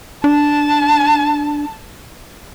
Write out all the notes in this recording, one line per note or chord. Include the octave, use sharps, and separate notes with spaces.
D4 A5